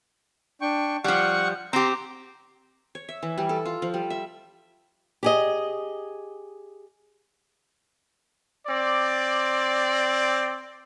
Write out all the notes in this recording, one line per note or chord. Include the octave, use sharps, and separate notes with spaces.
D4 G5 C#6
F3 G3 F#5 C#6
C4 G4 A#5 C6
C#5
E5
E3
G3
A4
F4
F3
G3
E5
G4 G#4 D#5
C4 D5